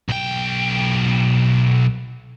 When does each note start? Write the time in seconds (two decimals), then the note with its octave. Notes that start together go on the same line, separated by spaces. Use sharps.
0.09 B1 G5